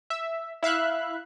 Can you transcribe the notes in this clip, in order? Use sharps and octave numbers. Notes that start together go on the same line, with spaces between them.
E5
E4 E5 F5 F#6